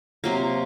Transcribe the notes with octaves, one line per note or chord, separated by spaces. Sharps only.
C3 F#3 A#3 F5